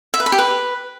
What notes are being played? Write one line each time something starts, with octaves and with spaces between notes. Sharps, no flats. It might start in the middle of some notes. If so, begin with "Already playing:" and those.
E5
B4
B5
G4
B4